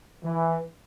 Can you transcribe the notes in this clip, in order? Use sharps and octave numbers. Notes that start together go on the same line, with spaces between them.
E3